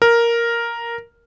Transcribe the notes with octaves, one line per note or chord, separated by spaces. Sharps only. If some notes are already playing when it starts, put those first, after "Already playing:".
A#4